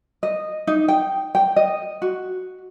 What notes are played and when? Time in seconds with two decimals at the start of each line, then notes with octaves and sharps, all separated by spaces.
0.23 D#5
0.67 D#4
0.88 G5
1.35 G5
1.56 D#5
2.02 F#4